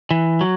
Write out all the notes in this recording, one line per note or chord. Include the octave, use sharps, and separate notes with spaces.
E3
F#3